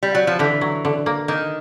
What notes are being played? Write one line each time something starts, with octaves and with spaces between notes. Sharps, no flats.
G3
F#3
F3
D3 E3
F#3
D3
A#3
D#3 A#3